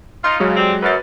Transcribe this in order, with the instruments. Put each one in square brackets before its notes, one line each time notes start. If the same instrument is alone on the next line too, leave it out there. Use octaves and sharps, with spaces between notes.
[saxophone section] D#4 F4 [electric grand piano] C6
[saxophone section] C#3 [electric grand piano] F#3 G#3
[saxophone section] G3 C4
[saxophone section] F#2 [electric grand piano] B4 A6